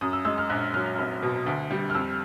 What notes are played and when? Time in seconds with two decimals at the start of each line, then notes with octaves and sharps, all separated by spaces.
0.01 F#2 D#6
0.13 E6
0.25 G#3 E6
0.38 F6
0.50 A#1 F#6
0.74 F#3 F6
0.98 F1
1.22 B2
1.46 D2
1.71 G3
1.90 F6
1.95 F2 E6